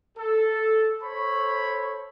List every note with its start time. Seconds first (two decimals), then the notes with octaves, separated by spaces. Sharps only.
0.17 A4
1.02 A4 C5 C#5 B5 C#6